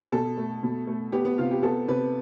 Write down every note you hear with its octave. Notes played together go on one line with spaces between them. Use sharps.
B2 A4
A3
B2
A3
B3 G4
B3
C3 F4
G4
B3 A4
C3 B4